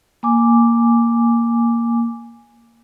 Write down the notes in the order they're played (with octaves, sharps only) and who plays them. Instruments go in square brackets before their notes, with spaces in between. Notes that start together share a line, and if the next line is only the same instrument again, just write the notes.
[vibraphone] A#3 G#5 D6